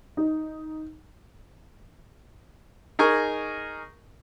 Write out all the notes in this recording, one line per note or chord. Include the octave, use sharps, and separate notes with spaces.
D#4
D#4 G#4 A#4 G#5 C#6